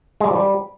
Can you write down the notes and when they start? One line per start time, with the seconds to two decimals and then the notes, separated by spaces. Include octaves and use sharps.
0.20 G#3
0.26 G3
0.31 F3
0.36 G3